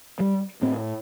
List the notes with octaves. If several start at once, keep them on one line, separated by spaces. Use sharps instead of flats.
G3
A2 C4